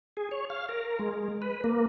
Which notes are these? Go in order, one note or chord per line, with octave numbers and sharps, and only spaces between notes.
G#4
C#5
F5
A#4
G#3
B4
A#3